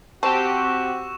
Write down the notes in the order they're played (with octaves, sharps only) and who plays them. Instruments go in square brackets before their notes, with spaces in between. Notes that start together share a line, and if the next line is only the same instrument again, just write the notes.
[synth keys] C4 G4 [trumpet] F#4 [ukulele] A5 [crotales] C#6 E6 E7